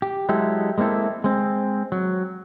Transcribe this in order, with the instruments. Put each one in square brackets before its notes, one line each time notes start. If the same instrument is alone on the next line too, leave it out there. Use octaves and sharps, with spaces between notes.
[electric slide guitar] G4
F#3 G#3 E4 G4 A4
G#3 A#3 C4 E4 A4
G#3 C4
F#3